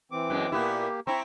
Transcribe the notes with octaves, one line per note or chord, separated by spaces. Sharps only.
E3 C4 D6
F#2 G#3
A#2 A#3 B3 E4 G4
C4 E4 A#5 C#6